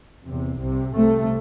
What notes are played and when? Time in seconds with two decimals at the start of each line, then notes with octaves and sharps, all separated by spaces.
0.24 E2 C3
0.59 C2 C3
0.94 C2 C3 A3